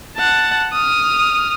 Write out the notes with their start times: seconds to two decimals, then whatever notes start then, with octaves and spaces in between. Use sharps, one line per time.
0.17 F#5 A5
0.73 D#6 F6